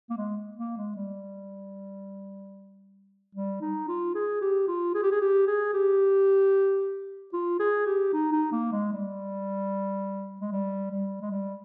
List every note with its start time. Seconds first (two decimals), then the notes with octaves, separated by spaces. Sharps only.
0.10 A#3
0.18 G#3
0.57 A#3
0.77 G#3
0.96 G3
3.35 G3
3.62 D#4
3.88 F4
4.15 G#4
4.42 G4
4.68 F4
4.95 G#4
5.03 G4
5.12 G#4
5.21 G4
5.47 G#4
5.74 G4
7.33 F4
7.60 G#4
7.86 G4
8.13 D#4
8.32 D#4
8.52 A#3
8.72 G#3
8.93 G3
10.41 G#3
10.52 G3
10.91 G3
11.22 G#3
11.31 G3